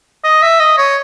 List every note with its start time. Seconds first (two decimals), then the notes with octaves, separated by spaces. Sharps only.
0.24 D#5
0.42 E5
0.60 D#5
0.78 C#5